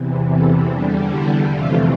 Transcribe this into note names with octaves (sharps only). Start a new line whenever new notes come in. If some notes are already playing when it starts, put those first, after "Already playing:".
Already playing: E2 C3 E3
A4
E2 D3 G3 D4
E4
F2 C3 E3 A3 F4